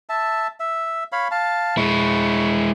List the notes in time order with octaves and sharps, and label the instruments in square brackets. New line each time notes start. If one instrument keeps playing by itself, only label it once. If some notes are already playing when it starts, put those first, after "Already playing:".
[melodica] E5 A5
E5
C#5 F5 B5
F5 A5
[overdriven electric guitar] G#3 E4 [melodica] C#6